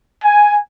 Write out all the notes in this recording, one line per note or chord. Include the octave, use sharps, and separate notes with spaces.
G#5